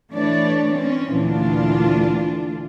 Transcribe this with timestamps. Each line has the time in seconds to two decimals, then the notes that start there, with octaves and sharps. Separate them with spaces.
0.12 E3 A3 D4 C#5 D5
0.73 C4 C#4
1.12 D2 A#2 E3 D4 F4